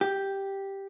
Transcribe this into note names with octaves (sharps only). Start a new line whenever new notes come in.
G4